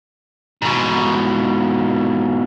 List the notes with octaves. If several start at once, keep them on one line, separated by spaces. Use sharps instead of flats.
G#2 B2